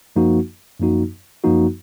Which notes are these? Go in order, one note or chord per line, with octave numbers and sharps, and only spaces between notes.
F#2 F3 A#3 D#4 F#4
F#2 F3 A#3 D#4 F#4
F#2 F3 A#3 D#4 F#4